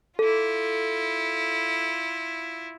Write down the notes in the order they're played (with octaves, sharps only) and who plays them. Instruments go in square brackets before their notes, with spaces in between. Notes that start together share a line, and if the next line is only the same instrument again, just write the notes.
[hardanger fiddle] E4 F4 [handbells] A4